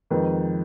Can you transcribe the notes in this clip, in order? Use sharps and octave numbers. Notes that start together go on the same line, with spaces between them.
F2 D#3 G#3 B4